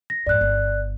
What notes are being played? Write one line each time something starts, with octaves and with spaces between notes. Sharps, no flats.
A#6
F2 G#2 D5 F#6
G1